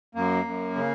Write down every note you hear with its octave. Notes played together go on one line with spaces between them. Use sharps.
F#2 A#3
F#2
C#3